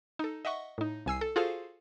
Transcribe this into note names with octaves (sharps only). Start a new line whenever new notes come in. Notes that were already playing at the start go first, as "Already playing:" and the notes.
D#4 A4
D#5 E5 F#5 C#6
A2 D#4
C2 G#5 E6 C7
A4
F4 F#4 G#4 A4 C5 F5